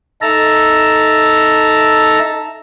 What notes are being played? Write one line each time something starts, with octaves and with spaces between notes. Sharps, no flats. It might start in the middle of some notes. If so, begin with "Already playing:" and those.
D#4 A4 E5 A5 A#5